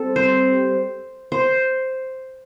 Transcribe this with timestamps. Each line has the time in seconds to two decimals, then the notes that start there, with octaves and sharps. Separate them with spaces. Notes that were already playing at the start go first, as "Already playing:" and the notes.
Already playing: G3 C4 A4
0.16 C5
1.32 C5